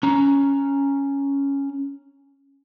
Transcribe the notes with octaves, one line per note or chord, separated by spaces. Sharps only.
C#4 A#5